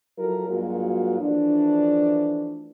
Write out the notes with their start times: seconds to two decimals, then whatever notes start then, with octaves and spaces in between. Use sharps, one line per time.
0.19 F3 F#3 E4 A4 A#4
0.48 G2 F#3 G#3 A#3 F4 F#4
1.20 E3 F3 A3 D4